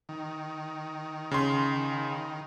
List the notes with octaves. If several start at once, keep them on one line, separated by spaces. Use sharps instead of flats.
D#3
C#3 C6